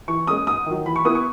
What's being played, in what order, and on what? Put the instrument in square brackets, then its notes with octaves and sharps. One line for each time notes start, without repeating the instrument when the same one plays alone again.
[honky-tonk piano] E3 [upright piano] C#6
[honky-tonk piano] G#3 C#4 [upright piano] D#6
[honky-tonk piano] G#2 [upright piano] D#6
[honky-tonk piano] D#3 F#3
[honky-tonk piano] E3 [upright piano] B5
[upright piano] C#6
[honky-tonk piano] B3 E4 B4 [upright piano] D#6
[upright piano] C#6